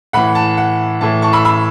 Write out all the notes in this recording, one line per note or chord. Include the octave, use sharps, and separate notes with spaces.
A2 E3 F#5 B5
A5
F#5
A2 E3 A5
A5 C#6
B5 E6
B5 E6